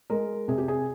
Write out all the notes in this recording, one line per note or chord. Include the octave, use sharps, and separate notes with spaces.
G#3 A#4
C3 G#4
G4
G#4